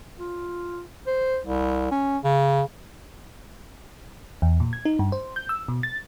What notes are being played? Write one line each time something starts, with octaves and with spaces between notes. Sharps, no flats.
F4
C5
C2
C#4
C#3
E2
A#2
G#6
D#4
G2
C5
G6
E6
B2
A6